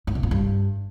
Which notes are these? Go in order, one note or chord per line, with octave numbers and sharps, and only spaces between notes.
G#2
B2
A#2
G2